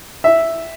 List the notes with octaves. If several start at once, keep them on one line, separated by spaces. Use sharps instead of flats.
E5